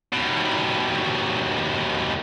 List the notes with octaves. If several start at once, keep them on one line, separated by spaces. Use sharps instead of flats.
D#2 B2